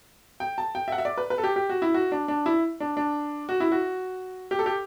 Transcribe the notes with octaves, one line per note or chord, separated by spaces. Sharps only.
G5
A5
G5
E5
F#5
E5
D5
B4
B4
A4
G4
G4
F#4
E4
F#4
D4
D4
E4
D4
D4
F#4
E4
F#4
G4
A4
G4